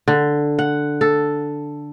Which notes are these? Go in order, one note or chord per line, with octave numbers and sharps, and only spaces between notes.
D3
F#5
A4